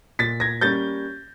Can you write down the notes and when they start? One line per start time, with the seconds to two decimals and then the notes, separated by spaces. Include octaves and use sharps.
0.19 A#2 A6 B6
0.40 G#6 A#6
0.61 G3 A#3 C#4 G6 A6